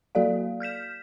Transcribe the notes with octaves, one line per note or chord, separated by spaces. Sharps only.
F#3 A#3 F#4 A4 D5 F5
F6 G6 B6 E7